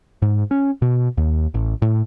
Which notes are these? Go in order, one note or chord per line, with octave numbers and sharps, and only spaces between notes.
G#2
C#4
B2
D#2
A1
A2